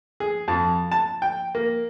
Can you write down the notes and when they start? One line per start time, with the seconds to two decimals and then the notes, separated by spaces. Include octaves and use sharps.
0.20 G#4
0.48 F2
0.92 A5
1.22 G5
1.55 A#3